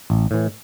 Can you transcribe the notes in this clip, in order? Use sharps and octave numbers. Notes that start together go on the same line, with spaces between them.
A1
A2 E3